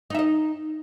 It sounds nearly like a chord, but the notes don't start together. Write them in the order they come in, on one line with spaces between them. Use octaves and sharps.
D#4 E5 D#5